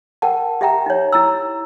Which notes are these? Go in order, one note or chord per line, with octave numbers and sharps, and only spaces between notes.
A#4 F#5 G5 A5
G4 E5 G5 A#5
D#4 C#5
E4 A#5 E6